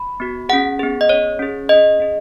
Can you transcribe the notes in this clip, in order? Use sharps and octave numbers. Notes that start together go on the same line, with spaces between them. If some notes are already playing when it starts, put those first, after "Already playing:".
Already playing: B5
B3 F#4
C#4 G#4 F#5
B3 G#4
D#5
C#4 G#4 C#5
C#4 G#4
C#4 G#4 D#5
C#4 G#4